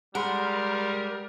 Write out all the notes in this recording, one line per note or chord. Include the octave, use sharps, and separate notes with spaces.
G3 G#3 A#4 F#5 B5 C6